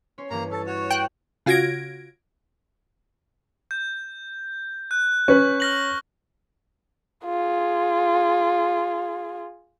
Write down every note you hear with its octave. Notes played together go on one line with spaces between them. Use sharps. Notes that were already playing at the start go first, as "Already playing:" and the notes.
C#4 C#5 C6
G2 E3 A#3 A#5
C#4 A4 A6
F#4 C#5
G5 F#6
C#3 F4 F#4 G#6 A#6 D7
G6
F#6
C#4 B4 C#6
F6 A#6 F#7
F4 G#4